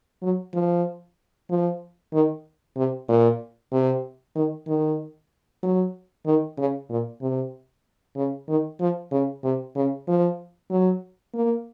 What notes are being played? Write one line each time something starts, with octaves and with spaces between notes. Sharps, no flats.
F#3
F3
F3
D#3
C3
A#2
C3
D#3
D#3
F#3
D#3
C#3
A#2
C3
C#3
D#3
F3
C#3
C3
C#3
F3
F#3
A#3